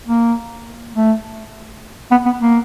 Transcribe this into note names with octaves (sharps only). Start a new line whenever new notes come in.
A#3
A3
B3
B3
A#3